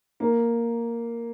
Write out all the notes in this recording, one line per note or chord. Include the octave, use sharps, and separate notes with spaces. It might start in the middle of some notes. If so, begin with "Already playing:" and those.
A#3